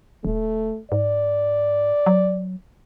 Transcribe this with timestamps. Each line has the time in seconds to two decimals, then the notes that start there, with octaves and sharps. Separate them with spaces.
0.25 D#1 A3
0.92 G#2 D5
2.06 F#3